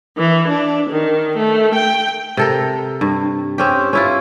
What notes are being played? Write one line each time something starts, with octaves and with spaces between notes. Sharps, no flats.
E3
D4
D#3
A3
G5
C3 A4 A#4
G2
C4 C#4 G4
C#4 E4 F4